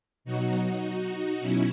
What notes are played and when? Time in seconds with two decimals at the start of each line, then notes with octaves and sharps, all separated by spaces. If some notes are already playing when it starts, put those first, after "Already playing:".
0.24 B2 F#3 D#4 F#4
1.40 B2 F#3 C#4 E4